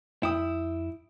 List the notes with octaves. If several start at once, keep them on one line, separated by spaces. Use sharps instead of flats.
F2 E4 G5 D#6